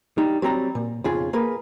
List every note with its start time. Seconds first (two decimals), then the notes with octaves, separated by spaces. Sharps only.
0.18 G3 D#4
0.42 F#3 G3 C4 A#5
0.75 A#2
1.04 B1 F2 C#3 F4 G#4
1.33 A#3 G#4 A#4 B4